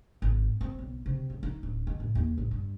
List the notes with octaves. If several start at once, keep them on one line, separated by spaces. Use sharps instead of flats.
G#1
C4
B1
C3
C#2
D#4
D1
D#3
A2
D#2
A1
G2